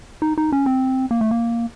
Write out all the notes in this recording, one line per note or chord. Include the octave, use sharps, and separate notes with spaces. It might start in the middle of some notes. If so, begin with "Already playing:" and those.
D#4
D#4
C#4
C4
A#3
A3
A#3